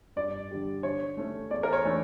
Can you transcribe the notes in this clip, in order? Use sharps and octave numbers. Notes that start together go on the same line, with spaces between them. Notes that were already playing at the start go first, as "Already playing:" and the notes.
G2 D5
D3 G3
D3 C#5
A3 C#4
E2 D5
A#4
C#5
E3 A3 D4